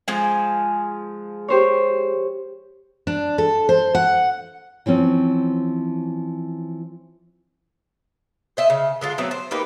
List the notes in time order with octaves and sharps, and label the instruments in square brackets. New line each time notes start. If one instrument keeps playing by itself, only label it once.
[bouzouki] F3 G#3 G#5
[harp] G4 C5 C#5
[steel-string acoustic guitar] D4
A4
C5
F#5
[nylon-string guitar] E3 F3 C4 C#4
[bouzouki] C5 D#5 E5
C#3
D3 G#3 F4
F#3 A3 B3 C4
C5
A#3 D#4 G4 B4